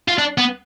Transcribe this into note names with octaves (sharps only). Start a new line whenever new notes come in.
F4
D4
B3